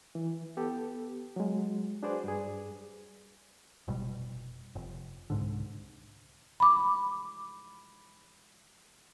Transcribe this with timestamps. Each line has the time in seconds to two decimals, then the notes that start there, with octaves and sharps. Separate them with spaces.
0.15 E3
0.57 B3 G4 A4
1.36 F#3 G#3
2.03 D4 F#4 G#4 B4 C5 D5
2.24 G2 G#4
3.88 F1 B2 G3
4.75 F1
5.30 C2 G#2 D3
6.60 B5 D6